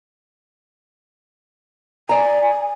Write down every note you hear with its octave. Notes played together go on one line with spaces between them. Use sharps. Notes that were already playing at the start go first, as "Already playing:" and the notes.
D5 G#5 A#5